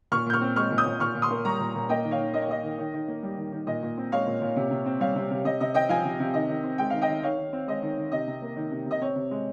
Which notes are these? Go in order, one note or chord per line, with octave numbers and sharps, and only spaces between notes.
A#2 C#6 F6
A#2 G6
C#6 F6
C4
G#3 C#6 F6
A#2
D#6 G6
A#2
A#2 C#6 F6
A#2
C6 D#6
A#3
G3 A#5 C#6
A#2
A#2
A#3 D#5 G5
D#3
C#5 F5
D#3
A#3 D#5
C#5
A#3 D#5
D#3
D#3
D#3
A#3
G3
D#3
D#3
A#2 D#5
A#2
C4
G#3 C#5 F5
A#2
A#2
C3
C3
C4
G3 C#5 F5
C3
C3
C3 D#5
C3 D#5
C4 D#5 G5
F3 F5 G#5
C3
C3
D#3 D#5
D#3
C4
G#3 G5
D#3 F5
D#5 G5
D#3
D#3 C#5 F5
D#3
C4
G#3 D#5
D#3
D#3
C3 D#5
C3
A#3
D#3
C3
C3 D#5
C4 C#5
C3
G#3